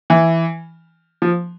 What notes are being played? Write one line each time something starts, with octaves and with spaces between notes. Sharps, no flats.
E3
F3